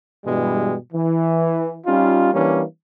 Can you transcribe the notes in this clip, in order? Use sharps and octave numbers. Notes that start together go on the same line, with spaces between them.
G2 B2 E3 G3 G#3
E3
G3 C#4 D#4 F4
E3 G3 A#3 C#4 D4